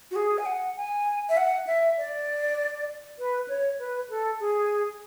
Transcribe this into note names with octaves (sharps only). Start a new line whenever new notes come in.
F#4
G#4
G#5
F#5
G#5
E5
F#5
E5
D5
B4
C#5
B4
A4
G#4